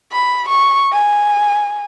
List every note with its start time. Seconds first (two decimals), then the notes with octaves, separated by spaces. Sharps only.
0.12 B5
0.49 C#6
0.92 G#5